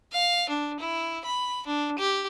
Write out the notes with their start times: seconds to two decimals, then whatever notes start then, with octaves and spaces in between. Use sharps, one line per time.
0.12 F5
0.49 D4
0.80 E4
1.25 B5
1.66 D4
1.98 G4